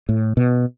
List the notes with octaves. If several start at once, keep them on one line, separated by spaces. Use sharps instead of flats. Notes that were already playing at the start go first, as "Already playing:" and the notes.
A2
B2